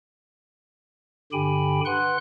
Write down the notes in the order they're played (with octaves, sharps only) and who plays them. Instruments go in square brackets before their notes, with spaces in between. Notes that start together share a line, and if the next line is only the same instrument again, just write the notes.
[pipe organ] G2 D3 G4 G5 G#5 B5
B4 F#5 C6 F#6